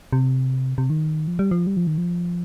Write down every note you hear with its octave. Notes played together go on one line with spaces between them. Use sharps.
C3
C3
D#3
F3
G3
F3
G3
F3
D#3
F3